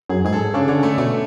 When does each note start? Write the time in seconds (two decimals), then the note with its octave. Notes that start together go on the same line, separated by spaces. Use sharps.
0.10 F#2 G#4
0.25 G#2 G#4
0.32 A4
0.54 C#3 D4
0.68 D3 C#4
0.83 A3
0.98 B2 A3